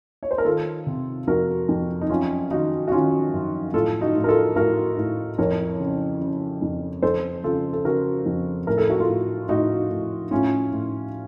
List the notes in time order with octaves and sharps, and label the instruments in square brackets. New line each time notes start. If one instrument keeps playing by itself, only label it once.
[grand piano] C#5
C5
A#4
D#3 F4 A4
C3
F2 F#4 A#4
F2
D#4
F#2 C#4 F4
D#3 D#4 F#4
F#4
D#3 C#4 F4
F#2
A2 F4 A4
D#4 F#4
A2
A#4
F4 A4
A2 F#4 A#4
A2
F2 A#4 C#5
C#3
C#3
F2
F2 A4 C5
C#3 F4 A4
A4
C#3 F#4 A#4
F2
A2 A#4
A4
F#4
F4 A4
A2
A2 D#4 F#4
A2
A2 C#4 F4
A2